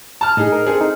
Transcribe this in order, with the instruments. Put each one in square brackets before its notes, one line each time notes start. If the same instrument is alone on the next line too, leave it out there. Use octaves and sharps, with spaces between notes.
[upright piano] A5 F6
[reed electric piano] A2 [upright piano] D#4 G#4
[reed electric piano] A#4
[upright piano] C4 G#4 A4
[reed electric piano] D#4